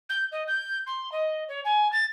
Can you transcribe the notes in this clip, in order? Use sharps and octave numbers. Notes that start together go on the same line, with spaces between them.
G6
D#5
G6
C6
D#5
C#5
G#5
A6